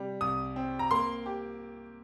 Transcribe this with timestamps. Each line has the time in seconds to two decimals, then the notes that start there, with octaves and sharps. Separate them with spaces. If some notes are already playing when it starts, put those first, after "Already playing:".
Already playing: C3 G3
0.21 C2 D#6
0.56 C4
0.79 A#5
0.91 A#3 C6
1.26 G4